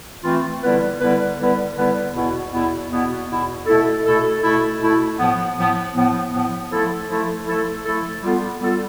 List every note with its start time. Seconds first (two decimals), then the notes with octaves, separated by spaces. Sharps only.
0.24 E3 A3 C4 F4
0.62 D3 G3 B3 E4 B4
1.01 D3 G3 B3 E4 B4
1.38 D3 G3 B3 E4 B4
1.76 D3 G3 B3 E4 B4
2.14 E2 B2 B3 E4
2.52 E2 B2 B3 E4
2.90 E2 B2 B3 E4
3.29 E2 B2 B3 E4
3.66 B2 A3 E4 A4
4.05 B2 A3 E4 A4
4.43 B2 A3 E4 A4
4.80 B2 A3 E4 A4
5.18 A2 F3 B3
5.57 A2 F3 B3
5.94 A2 F3 B3
6.32 A2 F3 B3
6.70 F3 A3 E4 A4
7.08 F3 A3 E4 A4
7.47 F3 A3 E4 A4
7.84 F3 A3 E4 A4
8.22 G3 B3 F4 A4
8.60 G3 B3 F4 A4